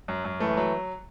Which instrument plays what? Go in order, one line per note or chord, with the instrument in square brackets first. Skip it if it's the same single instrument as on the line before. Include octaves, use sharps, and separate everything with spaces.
[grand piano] F#2
F#2
[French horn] E3 [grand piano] A3
[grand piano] F#3